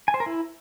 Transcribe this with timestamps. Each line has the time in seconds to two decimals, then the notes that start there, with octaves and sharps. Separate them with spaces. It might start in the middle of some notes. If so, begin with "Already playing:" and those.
0.08 G#5
0.14 C5
0.20 A#4
0.26 E4